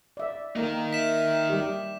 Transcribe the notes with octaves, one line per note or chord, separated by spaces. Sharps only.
D5 E5
A#3 D#4 A#4
E5 B6 E7
G3 G4